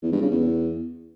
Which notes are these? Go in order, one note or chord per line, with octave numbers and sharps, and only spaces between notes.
E2
G2
C#3
E2